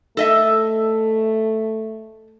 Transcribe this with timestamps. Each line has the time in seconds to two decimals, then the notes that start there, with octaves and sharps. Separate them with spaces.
0.17 A3 A4 D#5 E5